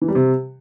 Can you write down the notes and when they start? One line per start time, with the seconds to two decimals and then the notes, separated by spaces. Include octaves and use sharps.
0.01 E3
0.08 G3
0.15 C3